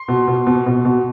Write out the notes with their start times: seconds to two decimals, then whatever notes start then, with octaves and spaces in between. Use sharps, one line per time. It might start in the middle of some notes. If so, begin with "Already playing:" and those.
Already playing: C6
0.08 B2
0.28 B2
0.47 B2
0.66 B2
0.85 B2